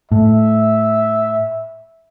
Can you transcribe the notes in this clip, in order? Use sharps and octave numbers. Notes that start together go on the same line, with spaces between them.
A2 E5